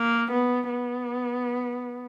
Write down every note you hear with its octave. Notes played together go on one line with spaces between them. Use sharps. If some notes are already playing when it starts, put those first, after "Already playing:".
Already playing: A#3
B3
B3